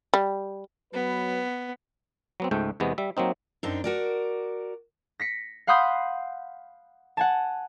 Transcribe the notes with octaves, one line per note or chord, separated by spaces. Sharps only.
G3
F#3 B3 B4
F#3 B3 C4
C#2 G#2 A3 G5
E2 C3 G#3 B3
G3 E5
F#3 A#3 C4 D#4
F#2 C4 D4 D#4
F#4 A#4 D5
A#6 B6 C#7
F5 F#5 B5 C6 D#6 G6
F#5 G#5 A5